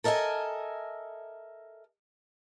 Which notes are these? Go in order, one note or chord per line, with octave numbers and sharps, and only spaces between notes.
A4 A#4 D#5 E5 G#5